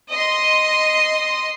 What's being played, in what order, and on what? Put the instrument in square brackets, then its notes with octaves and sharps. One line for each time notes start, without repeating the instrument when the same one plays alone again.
[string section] D#5 C6